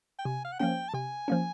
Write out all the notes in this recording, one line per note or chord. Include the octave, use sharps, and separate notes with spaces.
G5
C3 G#5
F5
F#5
F3 A#3 C#4 G5
A5
C3 G#5
F3 A#3 C#4